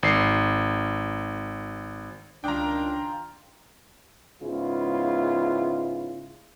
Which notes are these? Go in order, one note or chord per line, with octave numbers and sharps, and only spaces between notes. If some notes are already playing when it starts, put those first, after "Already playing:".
G#1 C7
C#2 D#3 D4 F4 G4 G#4 G5 A#5
G#2 C#3 G#3 B3 E4 F4